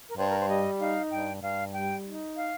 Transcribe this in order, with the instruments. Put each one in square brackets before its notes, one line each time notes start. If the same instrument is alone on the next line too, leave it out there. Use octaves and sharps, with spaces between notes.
[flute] A#4
[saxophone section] G2 [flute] C5
[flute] A#4
C5
[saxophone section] G3 [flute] D#5
[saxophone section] D#4 [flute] F5
[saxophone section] G2 [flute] G5
[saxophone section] G2 [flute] F5
[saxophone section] G3 [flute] G5
[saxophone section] D#4
[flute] F5